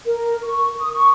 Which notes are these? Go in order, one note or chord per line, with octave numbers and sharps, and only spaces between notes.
A#4
C#6
D#6
C#6